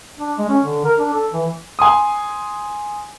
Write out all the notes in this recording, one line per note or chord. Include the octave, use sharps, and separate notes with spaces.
D4
G#3
C#4
D3
A#4
D4
A4
E3
G#5 C6 D#6